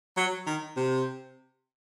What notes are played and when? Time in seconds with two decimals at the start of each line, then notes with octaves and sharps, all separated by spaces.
0.17 F#3
0.47 D#3
0.77 C3